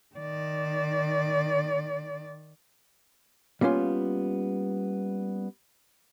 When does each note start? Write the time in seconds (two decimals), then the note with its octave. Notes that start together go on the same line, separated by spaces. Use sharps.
0.16 D#3 D5
3.61 G3 A#3 B3 C#4 F4